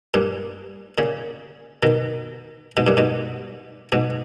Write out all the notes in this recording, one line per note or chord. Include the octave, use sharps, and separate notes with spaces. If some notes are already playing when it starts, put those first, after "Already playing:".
G2 A#2
A#2 C#3
B2 D#3
G#2 B2
G2 A#2
G#2 B2
G#2 B2